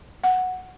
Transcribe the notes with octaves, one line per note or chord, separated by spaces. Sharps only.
F#5